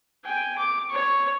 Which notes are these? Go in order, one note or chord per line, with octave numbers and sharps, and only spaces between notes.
G5 G#5
D6
C#5 C#6